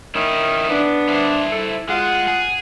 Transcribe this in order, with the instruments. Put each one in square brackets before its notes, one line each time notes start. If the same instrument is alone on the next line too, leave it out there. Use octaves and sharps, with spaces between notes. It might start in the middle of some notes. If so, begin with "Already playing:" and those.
[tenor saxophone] D#3 [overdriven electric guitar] C#4 E4
[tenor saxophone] B3 [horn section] D4
[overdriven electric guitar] E4 C5
[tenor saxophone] A4
[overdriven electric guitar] G#3 G#4 [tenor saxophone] F4 [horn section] F#5
[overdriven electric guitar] G#4